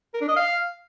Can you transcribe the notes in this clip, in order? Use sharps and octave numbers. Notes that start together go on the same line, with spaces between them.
A#4
D4
D#5
F5